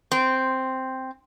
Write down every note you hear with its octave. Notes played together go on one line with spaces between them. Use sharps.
C4